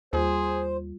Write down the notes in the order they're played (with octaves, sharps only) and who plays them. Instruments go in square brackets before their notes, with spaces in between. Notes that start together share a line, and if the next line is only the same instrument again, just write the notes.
[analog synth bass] D#2 [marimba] G3 F4 [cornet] G#4 [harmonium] C5